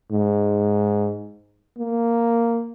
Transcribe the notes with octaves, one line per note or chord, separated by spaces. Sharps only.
G#2
A#3